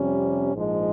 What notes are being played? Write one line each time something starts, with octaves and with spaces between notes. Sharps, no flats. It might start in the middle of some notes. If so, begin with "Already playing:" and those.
Already playing: F2 C3 G3 C#4
A#1 G#2 F3 G#3